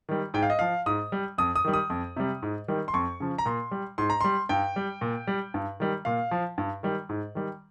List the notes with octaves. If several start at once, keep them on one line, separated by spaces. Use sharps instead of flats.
D#3 G3
G#2 G5
F5
D#5
F3 F5
G#2 D#6
G3
F2 D#6
D#6
D#3 G3
D#6
F2
C3 G3
G#2
D#3 G3
C6
F2 C#6
C#3 F3
A#5
A#2 C6
G3
G#2 C6
A#5
G3 C6
G2 G5
G3
A#2
G3
G2
D#3 G3
A#2 F5
F3
G2
D#3 G3
G#2
D#3 G3